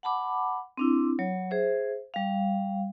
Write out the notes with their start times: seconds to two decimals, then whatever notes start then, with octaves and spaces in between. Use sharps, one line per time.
0.03 F#5 A5 B5 D6
0.77 C4 D4 E4
1.19 F#3 C#5
1.51 G#4 C5 E5
2.14 G3 F5